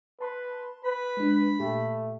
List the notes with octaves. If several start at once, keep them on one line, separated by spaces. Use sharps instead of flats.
B4 A5 C6
B4 B5
G#3 D4
A#2 A3 G4